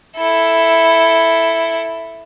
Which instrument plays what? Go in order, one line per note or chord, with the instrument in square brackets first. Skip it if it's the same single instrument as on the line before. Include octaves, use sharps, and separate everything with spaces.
[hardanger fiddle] E4 A4